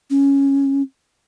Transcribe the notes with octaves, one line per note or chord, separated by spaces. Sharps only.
C#4